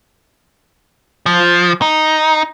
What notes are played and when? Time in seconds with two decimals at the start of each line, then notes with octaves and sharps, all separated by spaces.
1.26 F3
1.82 D#4